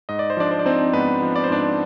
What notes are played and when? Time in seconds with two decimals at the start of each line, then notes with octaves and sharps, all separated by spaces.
0.09 G#2 D#5
0.19 D5
0.30 C5
0.37 F3 D4 D5
0.51 C5
0.59 D5
0.65 C4 D#4 C5
0.93 G#2 B3 B4
1.22 F3
1.36 D5
1.44 C5
1.50 G#2 D4 D5